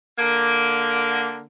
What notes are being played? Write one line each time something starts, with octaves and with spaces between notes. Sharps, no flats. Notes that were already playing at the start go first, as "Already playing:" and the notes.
D3 A#3